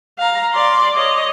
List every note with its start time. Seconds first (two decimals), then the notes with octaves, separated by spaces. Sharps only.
0.18 F5 A#5
0.53 D5 C6
0.95 C#5 D#5